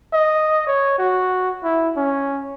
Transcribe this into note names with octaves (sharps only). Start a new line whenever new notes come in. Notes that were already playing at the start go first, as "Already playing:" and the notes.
D#5
C#5
F#4
E4
C#4